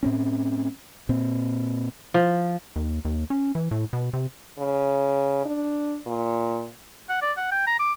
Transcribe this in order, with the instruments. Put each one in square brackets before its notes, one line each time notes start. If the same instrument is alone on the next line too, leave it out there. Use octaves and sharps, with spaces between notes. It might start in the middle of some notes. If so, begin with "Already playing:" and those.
[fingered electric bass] A2 C4 C#4
A#2 C4
[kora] F3
[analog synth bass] D#2
D#2
C#4
E3
A2
B2
C3
[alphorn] C#3
D4
A#2
[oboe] F#5
D5
F#5
G5
A#5
D6